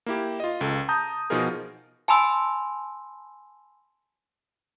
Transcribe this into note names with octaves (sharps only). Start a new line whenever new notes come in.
A#3 E4 G4
F4 D#5
C#2 A4
A5 A#5 D#6 G6
B2 F3 D#4 F4 G#4 A#4
G#5 A5 B5 C6 E6